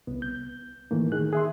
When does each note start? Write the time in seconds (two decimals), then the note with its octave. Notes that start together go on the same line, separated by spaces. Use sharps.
0.07 C2 B3
0.22 G6
0.91 A2 D#3 E3 A3 A#3
1.12 D#3 G#4 F#6
1.33 G#4 E5 C6